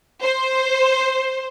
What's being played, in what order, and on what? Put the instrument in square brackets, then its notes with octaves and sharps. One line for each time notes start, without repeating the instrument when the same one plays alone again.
[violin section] C5